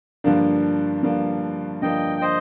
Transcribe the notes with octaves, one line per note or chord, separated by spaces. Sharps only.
G2 D3 F3 A#3 D4
G2 D3 F3 A#3 D4
G2 D3 F3 A#3 D4 D#5 G5
C5 D#5